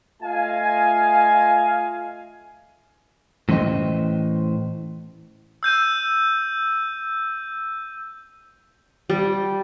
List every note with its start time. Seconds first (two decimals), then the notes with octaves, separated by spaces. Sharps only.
0.23 A3 F4 D#5 F5 G#5
3.49 A2 E3 C#4 C5 D#5 G5
5.63 E6 G6 D#7
9.10 G3